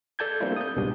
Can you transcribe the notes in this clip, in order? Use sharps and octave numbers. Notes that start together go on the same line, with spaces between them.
A4 D5 A5 G6 G#6
G3 A#3 C4 D4 E4 F4
D#6 G6
C2 G#2 B2 G3 D4